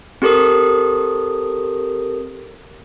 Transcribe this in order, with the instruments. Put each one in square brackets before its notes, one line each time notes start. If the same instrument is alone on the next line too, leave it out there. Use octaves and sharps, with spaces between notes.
[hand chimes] C4 G4 A4 A#4 D#6